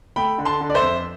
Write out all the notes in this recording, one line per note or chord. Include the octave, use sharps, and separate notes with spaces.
A3 G5 B5
D3
A5 C6
D3
D5
C5 E5
F2